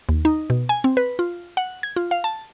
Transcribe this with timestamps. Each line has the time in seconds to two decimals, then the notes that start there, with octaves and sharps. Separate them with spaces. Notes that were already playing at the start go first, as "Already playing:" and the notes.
0.09 D#2
0.25 D#4
0.50 B2
0.69 G#5
0.84 C4
0.97 B4
1.19 F4
1.57 F#5
1.83 G#6
1.96 F4
2.11 F5
2.24 A5